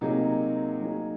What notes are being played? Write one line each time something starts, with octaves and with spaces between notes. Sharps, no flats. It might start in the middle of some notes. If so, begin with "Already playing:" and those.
C3 F#3 A#3 D#4 G#4
F#3 A#3 D#4 G#4